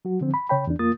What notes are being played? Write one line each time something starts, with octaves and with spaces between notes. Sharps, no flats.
F#3 F#4
D3 F3 C4
B5
C#3 C#5 G5 B5
E2 D4
F2 A#3 F4 D#6 A6